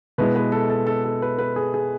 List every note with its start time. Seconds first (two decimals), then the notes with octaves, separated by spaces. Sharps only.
0.18 B2 G#3 B3 E4 B4
0.36 B4
0.52 A4
0.70 A4
0.87 A4
1.04 A4
1.22 B4
1.39 B4
1.56 G#4
1.74 G#4